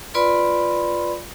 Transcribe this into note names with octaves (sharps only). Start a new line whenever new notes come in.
F4 B4 D5 B5 C6